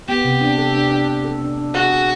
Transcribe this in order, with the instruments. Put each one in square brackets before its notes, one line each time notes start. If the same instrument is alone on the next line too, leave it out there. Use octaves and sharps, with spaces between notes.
[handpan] B3 [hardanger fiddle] G4
[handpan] C3
D4
A4
D4
D4
D4
A4
D4
D4
[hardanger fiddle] F#4 [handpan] G#4
[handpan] G#4